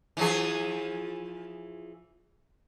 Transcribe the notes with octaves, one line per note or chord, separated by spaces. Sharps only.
E3 F3 G#4